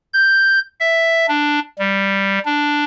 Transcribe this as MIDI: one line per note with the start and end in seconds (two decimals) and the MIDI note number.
0.13 0.59 91
0.80 1.26 76
1.29 1.60 62
1.79 2.39 55
2.46 2.85 62